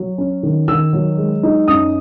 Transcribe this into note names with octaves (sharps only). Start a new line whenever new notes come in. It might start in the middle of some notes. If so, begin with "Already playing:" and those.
Already playing: F#3
C#4
D#3
D#3 E6
F#3
G#3
D#4
F#2 D#6